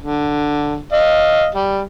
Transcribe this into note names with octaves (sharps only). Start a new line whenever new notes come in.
D3
D#5 F5
G3